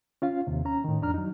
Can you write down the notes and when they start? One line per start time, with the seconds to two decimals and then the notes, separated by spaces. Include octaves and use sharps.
0.22 C#4 F4 F5
0.47 D#2 C3
0.65 C#4 A#5
0.84 A2 D#3
1.02 F2 D4 A#5 F6
1.14 F#3 D#4